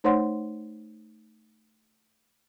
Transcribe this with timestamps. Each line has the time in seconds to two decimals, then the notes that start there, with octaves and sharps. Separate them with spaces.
0.04 A3 D#4 C5 C#5 F#5 C6